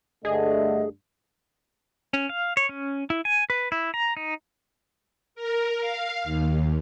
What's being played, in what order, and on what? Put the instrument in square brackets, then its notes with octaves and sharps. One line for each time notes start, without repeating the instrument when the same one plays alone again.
[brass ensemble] G2 D3 A3 [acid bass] G#4 [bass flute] D#5
[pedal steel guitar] C#4
F5
C#5
C#4
E4
G#5
B4
E4
A#5
D#4
[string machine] A#4
F5
D#2